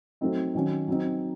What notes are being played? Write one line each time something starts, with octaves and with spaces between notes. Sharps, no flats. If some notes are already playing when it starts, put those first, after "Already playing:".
F#3 A3 C4 D#4
D#3 F#3 C#4
F#3 C4 D#4